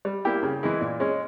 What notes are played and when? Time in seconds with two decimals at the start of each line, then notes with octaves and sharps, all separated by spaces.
0.05 G3
0.25 A#3 E4 G4
0.43 C#3
0.63 E3 G#3 E4
0.81 A#2
1.00 G#3 C#4